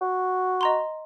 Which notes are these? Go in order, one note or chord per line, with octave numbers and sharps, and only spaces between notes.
F#4
D#5 A#5 C6